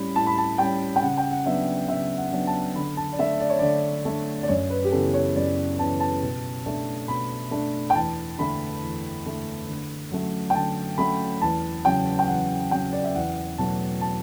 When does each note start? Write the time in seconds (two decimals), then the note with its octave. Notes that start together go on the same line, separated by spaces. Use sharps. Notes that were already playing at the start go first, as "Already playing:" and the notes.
Already playing: A2 G3 C#4 B5
0.16 A2 A5
0.27 B5
0.38 A5
0.58 G3 C#4 G5
0.96 G5
1.02 C#3 F#5
1.17 G5
1.32 F#5
1.46 F#3 B3 D4 E5
1.88 C#3 E5
2.17 F#5
2.32 F#3 B3 D4
2.47 A5
2.75 D3 B5
2.97 A5
3.13 D5
3.19 A3 D4 E5
3.40 D5
3.50 C#5
3.59 D3 D5
4.05 A3 D4
4.43 D5
4.48 F#2 C#5
4.70 B4
4.84 G4
4.92 C#3 E3 B3 A4
5.14 C#5
5.36 F#2 D5
5.79 C#3 E3 B3 A5
6.00 A5
6.22 B2
6.65 A3 D4
7.08 B2 B5
7.51 A3 D4
7.90 G5
7.95 E2 A5
8.38 D3 A3 B5
8.82 E2
9.25 D3 A3
9.68 D3
10.11 F#3 A3 C#4
10.50 G5
10.55 D3 A5
10.98 F#3 A3 C#4 B5
11.41 E2 A5
11.85 C#3 F#3 G5
12.19 G5
12.28 E2 F#5
12.71 C#3 F#3 G5
12.93 D5
13.04 E5
13.14 E2 F#5
13.58 B2 F#3 A3 A5
14.01 A5